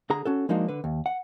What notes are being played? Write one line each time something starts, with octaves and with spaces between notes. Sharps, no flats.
D3 G#4 A#5
C#4 F#4 A4
F3 G#3 A#3 D4 D#4 F#4
D3 B4
D#2
F#5